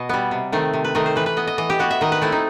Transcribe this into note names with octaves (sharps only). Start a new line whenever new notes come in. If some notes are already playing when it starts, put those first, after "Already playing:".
Already playing: B2 D#5
G3 B3
C3
D#3 A3 C4
C3
B4
D#3 A3 C4 D#5
C5
E3 B4
B4
B3 D#5
D#5
E3 D#5
G4
B3 F#4
E5
D#3 D#5
B4
A3 C4 E4
D#4